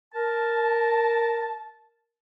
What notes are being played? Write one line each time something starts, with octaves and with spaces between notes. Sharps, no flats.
A#4 A5